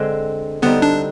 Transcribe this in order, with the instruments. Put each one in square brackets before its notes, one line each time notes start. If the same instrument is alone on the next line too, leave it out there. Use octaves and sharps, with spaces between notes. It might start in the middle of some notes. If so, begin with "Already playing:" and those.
Already playing: [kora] D3 G#3 C4
[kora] D3 G3 C4 D#4 [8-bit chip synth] B3
[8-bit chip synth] D4